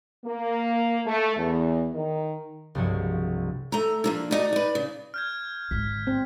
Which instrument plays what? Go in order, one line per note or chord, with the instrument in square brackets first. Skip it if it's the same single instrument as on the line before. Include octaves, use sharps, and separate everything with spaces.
[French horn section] A#3
A3
E2
D#3
[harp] C2 G2 F3 F#3 G#3 C#5
[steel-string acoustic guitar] A3 A#5 [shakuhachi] A4
[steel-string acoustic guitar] F3 A#3 D4
[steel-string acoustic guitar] A3 D#4 F#4 [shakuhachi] D5
[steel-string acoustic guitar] D#4 B4
C#3
[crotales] F6 G6 G#6
[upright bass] G#1 D3 [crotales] B6
[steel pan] C4